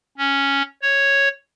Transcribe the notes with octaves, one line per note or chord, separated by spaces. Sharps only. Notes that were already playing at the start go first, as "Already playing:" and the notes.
C#4
C#5